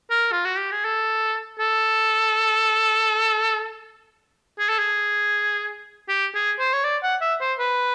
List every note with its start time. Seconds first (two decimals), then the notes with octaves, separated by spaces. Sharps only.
0.10 A#4
0.32 F4
0.45 F#4
0.58 G4
0.72 G#4
0.85 A4
1.59 A4
4.59 G#4
4.69 A4
4.79 G#4
6.09 G4
6.35 G#4
6.59 C5
6.73 C#5
6.84 D5
7.03 F#5
7.21 E5
7.40 C5
7.59 B4